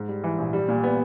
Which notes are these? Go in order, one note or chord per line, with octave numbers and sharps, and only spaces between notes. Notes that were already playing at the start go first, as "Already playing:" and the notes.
Already playing: G#2
G3
E3
A#1
G3
A#2
B3